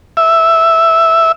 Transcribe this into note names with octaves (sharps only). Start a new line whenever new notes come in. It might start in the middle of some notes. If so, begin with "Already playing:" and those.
E5